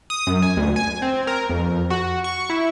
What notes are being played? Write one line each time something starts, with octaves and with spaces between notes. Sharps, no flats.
D#6
F#2
G#5
D2
G#5
C4
A#4
F2
F#4
C#6
E4